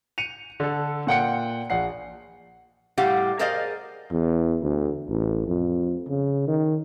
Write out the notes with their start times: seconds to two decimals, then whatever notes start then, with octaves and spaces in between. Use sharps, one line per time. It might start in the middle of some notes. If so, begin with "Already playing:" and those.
0.18 C#7 D#7 F7
0.60 D3 A4
1.07 A#2 F#5 G5 C#7
1.70 A#1 F#5 C7
2.98 A2 G3 G4 F5 F#5
3.39 G#4 A#4 C5 D5 D#5 F5
4.11 E2
4.63 D2
5.08 A1
5.48 F2
6.08 C#3
6.48 D#3